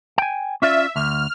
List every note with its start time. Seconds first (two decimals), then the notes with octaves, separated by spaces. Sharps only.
0.18 G5 G#5
0.62 C#4 F4 D5 E5
0.96 D2 F6